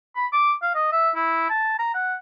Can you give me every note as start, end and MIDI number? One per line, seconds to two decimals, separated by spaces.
0.16 0.26 83
0.32 0.53 86
0.62 0.71 77
0.75 0.88 75
0.92 1.10 76
1.15 1.45 64
1.50 1.76 81
1.79 1.89 82
1.94 2.15 78